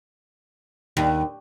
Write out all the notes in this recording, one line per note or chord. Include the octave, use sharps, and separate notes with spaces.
D#2